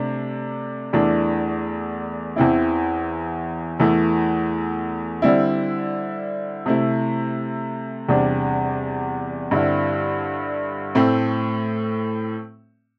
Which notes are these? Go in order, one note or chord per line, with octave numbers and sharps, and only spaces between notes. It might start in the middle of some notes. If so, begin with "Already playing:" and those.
Already playing: C3 A3 D4
E2 E3 A3 D4
E2 E3 C4 E4
E2 E3 A3
D3 G3 C4 E4
C3 A3 E4
E2 C3 G3 D4
G2 D3 C4 E4
A2 A3 C4